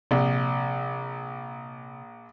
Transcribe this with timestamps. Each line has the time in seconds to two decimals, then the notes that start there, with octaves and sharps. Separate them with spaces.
0.11 A#1 C3